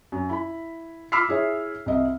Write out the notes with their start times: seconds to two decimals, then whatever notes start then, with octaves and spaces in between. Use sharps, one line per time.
0.12 F#2
0.29 E4 B5
1.12 B5 D6 E6 F6 B6 C7
1.29 E4 G#4 C#5 E5
1.86 C2 D#5 E5